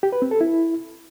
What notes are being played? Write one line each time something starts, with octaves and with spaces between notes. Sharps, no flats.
G4
B4
C4
A4
E4